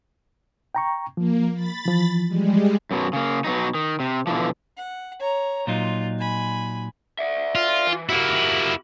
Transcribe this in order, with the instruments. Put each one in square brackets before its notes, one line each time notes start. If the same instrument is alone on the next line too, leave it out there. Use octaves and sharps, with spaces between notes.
[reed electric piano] G5 A#5 C#6
[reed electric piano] F3 [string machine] A#3
[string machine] B5 A6
[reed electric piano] E3 F3
[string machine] G3 G#3
[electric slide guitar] F#2 B2 F#3
C#3 A#3
B2 F#3 D#4
D#3
C3
B2 D3 E3 F3
[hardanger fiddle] F#5
C#5 A#5
[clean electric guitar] A#2 F#3 D#4 [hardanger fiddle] F4
[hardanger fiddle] G#5 B5
[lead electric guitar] D5 E5
[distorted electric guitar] F4
[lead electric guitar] E3
[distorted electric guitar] A#3 E4 [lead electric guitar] F#4 G4